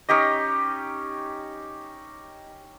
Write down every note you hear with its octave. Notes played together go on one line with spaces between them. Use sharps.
C#4 D#4 G4 D#5